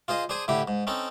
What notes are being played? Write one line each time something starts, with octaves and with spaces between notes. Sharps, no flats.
F4 G#4 C5 D#5
D4 G#4 C5 G#5 D#6
A2 D3 E4 G4
G#2
C4 C#4 D#4 A4